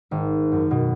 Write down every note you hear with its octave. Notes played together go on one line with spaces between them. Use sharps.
G#1
F#2
B2